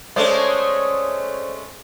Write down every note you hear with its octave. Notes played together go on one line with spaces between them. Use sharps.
G#3 A3 C#4 C5 D5